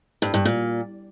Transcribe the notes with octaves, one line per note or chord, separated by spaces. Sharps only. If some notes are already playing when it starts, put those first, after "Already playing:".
G2
G2
A#2